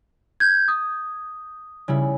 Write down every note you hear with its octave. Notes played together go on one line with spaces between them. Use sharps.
G6 G#6
D#6
C#3 G3 E4